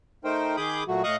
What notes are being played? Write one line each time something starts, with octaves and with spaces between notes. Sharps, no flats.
A3 D#4 A#4 C5 G5
D#3 G#4 B5 D6 D#6 G6
A#2 F#3 A3 F#4
A2 D#5 F5 C#6 D#6 F#6